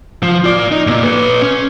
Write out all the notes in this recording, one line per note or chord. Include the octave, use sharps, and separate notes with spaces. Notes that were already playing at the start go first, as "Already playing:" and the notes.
F3
F4 D5
D#4
G2 A#2
B4 C#5
C#4